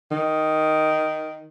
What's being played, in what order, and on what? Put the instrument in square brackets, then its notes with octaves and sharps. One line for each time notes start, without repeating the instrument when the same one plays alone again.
[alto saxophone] D#3